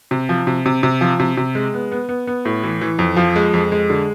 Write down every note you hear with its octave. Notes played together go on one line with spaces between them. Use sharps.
C3
F3
C3
C3
C3
F3
C3
C3
G#3
B3
B3
B3
B3
A2
E3
E3
F2
F3
G#3
F2
G#3
D3